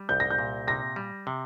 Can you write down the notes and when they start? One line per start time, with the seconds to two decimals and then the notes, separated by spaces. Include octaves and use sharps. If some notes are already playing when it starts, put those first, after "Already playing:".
Already playing: G3
0.09 C2 G6
0.20 A#6
0.30 G6
0.38 A#2
0.67 C3 A#6
0.96 G3
1.27 C3